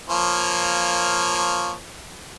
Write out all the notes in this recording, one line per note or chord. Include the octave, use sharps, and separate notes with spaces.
F3 A#3 C#5